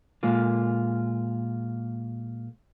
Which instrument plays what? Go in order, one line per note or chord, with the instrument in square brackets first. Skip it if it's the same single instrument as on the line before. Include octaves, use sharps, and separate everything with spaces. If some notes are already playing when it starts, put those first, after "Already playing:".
[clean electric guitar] A#2 G#3 A#3 F4